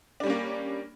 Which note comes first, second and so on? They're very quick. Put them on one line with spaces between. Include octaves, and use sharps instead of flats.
D4 G3 C#4 A#3